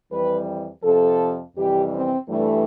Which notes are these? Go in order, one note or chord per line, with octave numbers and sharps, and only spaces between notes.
F2 E3 G3 B4
F2 C3 F3 A4
F2 C3 E3 G3 G4
C4
G2 E3 G3 A3